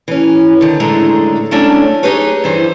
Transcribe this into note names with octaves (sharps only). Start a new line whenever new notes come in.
E3 C#4
D3 D#3
F#2 A2 D3 G#3 A3 A#5
F#3 G#3 A3 C#4 D4 E4
D#4 G4 G#4 B4 C#5
G2 E3 C5